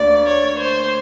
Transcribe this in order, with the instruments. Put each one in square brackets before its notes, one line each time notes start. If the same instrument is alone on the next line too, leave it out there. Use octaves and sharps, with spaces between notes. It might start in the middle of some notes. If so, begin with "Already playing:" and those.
Already playing: [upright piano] D2 A#3 [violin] D5
[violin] C#5
C5